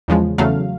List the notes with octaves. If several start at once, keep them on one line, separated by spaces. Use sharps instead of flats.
E2 C#3 F3 G#3
E2 C#3 F#3 A3 F5